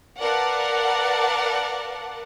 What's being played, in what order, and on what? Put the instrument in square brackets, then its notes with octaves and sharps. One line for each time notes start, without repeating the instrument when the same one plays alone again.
[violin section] A#4 B4 D5 F5 F#5 A5